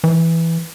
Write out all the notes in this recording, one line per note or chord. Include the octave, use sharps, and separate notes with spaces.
E3